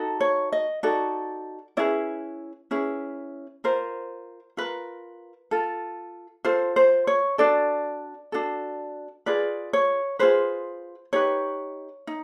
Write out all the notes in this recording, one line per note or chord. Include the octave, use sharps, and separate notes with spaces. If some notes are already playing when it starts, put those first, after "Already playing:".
Already playing: D#4 F#4 A4
C#5
D#5
D#4 F#4 A4 D5
C#4 E4 G#4 B4 D5
C#4 E4 G#4 B4
F4 A#4 C5
F4 A#4 B4
F4 A4
F4 A4 C5
C5
C#5
D4 F#4 A4 D5
D4 F#4 A4
F4 G#4 B4 D5
C#5
F4 G#4 B4 C5
D#4 G4 B4 C#5
D#4